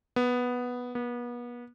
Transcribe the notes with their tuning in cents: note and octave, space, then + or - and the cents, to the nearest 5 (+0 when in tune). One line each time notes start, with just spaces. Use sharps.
B3 -5
B3 -35